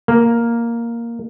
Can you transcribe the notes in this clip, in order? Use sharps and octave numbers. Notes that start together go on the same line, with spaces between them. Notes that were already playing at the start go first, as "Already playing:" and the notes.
A#3